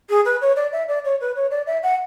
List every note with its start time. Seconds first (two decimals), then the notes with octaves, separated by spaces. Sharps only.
0.09 G#4
0.25 B4
0.41 C#5
0.56 D5
0.72 E5
0.88 D5
1.04 C#5
1.20 B4
1.35 C#5
1.51 D5
1.66 E5
1.82 F#5